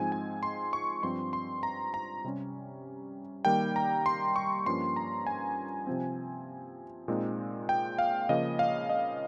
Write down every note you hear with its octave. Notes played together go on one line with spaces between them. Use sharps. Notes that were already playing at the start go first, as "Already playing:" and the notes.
Already playing: G#2 F3 G#3 C4 D#4 G#5
G#5
C6
C#6
G2 F3 C4 C6
C6
A#5
A#5
C3 G3 C#4
D#3 G3 A#3 G5
A#5
C6
C#6
G2 F3 A#3 C#4 C6
A#5
G#5
C3 F3 C4
A#2 G#3 C4 D#4
G5
F5
C#3 F3 A#3 D#5
F5
D#5